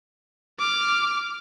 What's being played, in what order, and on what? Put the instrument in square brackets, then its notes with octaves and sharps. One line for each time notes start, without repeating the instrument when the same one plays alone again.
[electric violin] D6 F6